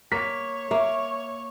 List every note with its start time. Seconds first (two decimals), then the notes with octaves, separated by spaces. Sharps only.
0.12 A#3 C#5 C#6 B6
0.71 A#3 E5